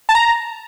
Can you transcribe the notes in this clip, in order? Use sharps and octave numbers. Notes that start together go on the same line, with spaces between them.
A5
A#5